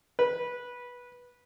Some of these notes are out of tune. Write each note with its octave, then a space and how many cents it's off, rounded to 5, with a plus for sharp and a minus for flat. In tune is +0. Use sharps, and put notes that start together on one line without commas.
B4 -15